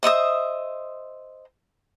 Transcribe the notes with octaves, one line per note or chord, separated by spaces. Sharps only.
C5 D#5 E5 D#6